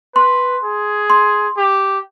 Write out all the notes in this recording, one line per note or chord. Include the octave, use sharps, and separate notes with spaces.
B4 C6
G#4
C6
G4